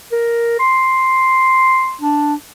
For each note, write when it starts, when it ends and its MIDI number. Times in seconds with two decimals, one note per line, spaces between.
0.12 0.55 70
0.59 1.95 84
2.01 2.34 62